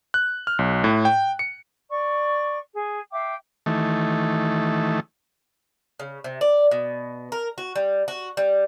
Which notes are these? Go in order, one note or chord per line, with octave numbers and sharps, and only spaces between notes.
F#6
F6
B1
A2
G5
C#7
D5 C#6
G#4
E5 F5 G5 D6
D#3 E3 A3
C#3
C3
D5
B2
A#4
F#4
G3
F#4
G3